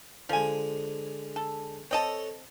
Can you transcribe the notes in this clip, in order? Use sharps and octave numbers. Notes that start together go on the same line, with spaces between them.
D3 F3 G#3 G#5
A4
C4 A4 C#5 D#5 A5